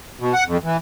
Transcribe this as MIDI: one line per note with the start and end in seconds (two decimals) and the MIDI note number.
0.20 0.33 47
0.34 0.44 78
0.46 0.57 41
0.63 0.77 52